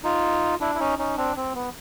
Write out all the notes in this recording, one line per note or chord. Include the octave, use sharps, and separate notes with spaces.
D#4 F4
D4 E4
E4
C#4 D#4
C#4 D#4
C4 D4
C4
B3